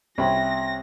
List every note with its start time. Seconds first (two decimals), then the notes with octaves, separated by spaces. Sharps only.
0.18 C2 C#4 E5 G5 B5 A#6